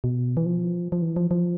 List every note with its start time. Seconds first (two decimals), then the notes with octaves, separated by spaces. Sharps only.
0.04 B2
0.37 E3
0.46 F3
0.92 F3
1.02 E3
1.16 F3
1.31 F3